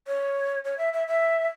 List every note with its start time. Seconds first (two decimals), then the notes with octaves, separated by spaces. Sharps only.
0.07 C#5
0.65 C#5
0.78 E5
0.93 E5
1.07 E5